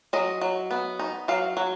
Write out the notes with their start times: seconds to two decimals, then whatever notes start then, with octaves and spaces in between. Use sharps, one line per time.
0.13 F#3 D#5
0.41 F#3
0.71 B3
0.99 D#4
1.28 F#3 F5
1.57 F#3